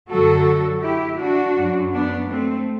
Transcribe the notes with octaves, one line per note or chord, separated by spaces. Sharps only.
F#2 D3 F#3 F#4 A4
E4 G4
D4 F#4
F#2 F#3
B3 D4
A3 C4